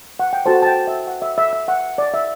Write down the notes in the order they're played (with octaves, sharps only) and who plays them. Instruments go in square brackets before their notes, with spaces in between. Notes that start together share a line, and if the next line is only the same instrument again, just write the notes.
[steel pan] F#5
G5
F#4 A4 C5 A5
A5
G5
E5
F#5
E5
E5
E5
F#5
D5
E5